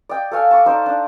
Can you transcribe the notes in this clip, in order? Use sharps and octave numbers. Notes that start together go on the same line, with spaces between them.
D5 D#5 G5
A4 C#5 F5 G#5
A5 C#6 D6
D#4 C5 D5
D4